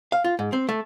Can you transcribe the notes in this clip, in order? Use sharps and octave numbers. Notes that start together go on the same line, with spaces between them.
F5
F4
G#2
C4
A3